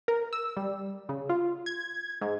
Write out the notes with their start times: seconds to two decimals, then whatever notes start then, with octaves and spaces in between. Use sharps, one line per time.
0.08 A#4
0.33 E6
0.57 G3
1.09 C#3
1.29 F4
1.66 G#6
2.21 G#2